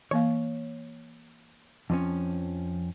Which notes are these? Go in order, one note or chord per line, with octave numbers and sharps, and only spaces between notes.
E3 A#3 C#5 F5
F2 F3 C#4